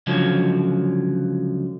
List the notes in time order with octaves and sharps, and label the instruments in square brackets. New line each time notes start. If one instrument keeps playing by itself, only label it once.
[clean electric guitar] C#2 D3 F3 F#3